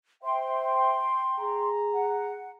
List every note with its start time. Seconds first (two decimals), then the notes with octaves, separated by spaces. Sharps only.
0.23 C5 E5 G5 C6
1.39 G#4 A#5
1.92 F#5